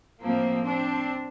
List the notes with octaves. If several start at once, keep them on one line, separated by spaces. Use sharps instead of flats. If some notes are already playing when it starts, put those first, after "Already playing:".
A2 F3 A#3 C4
C4 D4